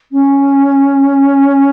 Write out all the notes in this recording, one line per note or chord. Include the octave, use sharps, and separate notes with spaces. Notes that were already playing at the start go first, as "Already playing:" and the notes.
C#4